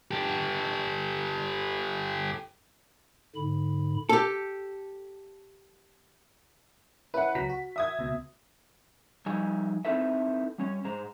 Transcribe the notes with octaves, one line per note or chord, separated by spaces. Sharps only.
G4 A4
G#2 D3 B5
G4 A4
C#4 E4 B4 F#5
C#2 F#3 A#5 B6
F#4
E5 D#6 G#6
C#2 B2
F3 G3 D#4 D#5 G#5
C4 D#4 E4 A4 B4 E5
G3 C#4 C#5
G#2 G#3 C5 A#5